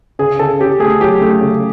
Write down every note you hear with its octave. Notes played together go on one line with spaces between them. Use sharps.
C#3 G#4
C#3 A4
C#4 G4
A3 G#4
F#3 G4
A3
C#3